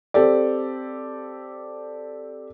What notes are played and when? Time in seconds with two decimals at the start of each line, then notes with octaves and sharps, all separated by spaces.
0.14 C4 G4 A4 D5